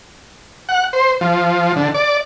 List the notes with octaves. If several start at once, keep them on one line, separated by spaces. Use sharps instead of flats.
F#5
C5
F3
D3
D5